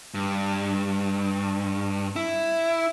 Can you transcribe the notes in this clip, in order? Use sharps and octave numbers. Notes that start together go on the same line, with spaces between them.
G2
E4